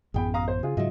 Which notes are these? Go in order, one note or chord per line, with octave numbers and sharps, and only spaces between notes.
A1 F#2 B3 G#4 G5 B5
F5 A#5 D#6
C5
C#3 F4 G#4
G#2 C#3 F#3 F4 D#5 E5